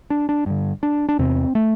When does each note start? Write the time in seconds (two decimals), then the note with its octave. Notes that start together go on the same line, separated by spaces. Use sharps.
0.10 D4
0.29 D4
0.46 G2 D3
0.83 D4
1.09 D4
1.19 E2 C3 C4
1.55 A3